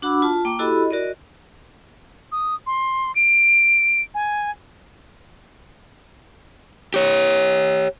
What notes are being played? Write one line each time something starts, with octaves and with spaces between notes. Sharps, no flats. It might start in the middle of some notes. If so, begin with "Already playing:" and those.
D4 F#4 F#5 B5 D6 E6
F4 A5
A#3 G5 D6
E4 F#4 G4 A4 D#5 B5
F#4 A#4 D5 D#5
D#6
C6
D7
G#5
G4 C#5